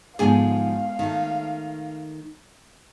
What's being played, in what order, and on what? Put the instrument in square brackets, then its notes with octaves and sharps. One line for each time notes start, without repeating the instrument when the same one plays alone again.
[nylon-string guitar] G#2 D3 F3 [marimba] G#3 B3 [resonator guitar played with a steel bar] G#4 G#5 [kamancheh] F5
[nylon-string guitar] D#3 A3